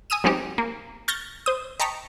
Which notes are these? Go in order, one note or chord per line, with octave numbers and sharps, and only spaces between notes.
G#5 D#6 E6 D#7
F#3 G#3 C4 C#4 D#4 G4
A#3
C#6 F6 G6 A6 A#6
C5 D#6
D#5 G5 A5 A#5 C#6 B6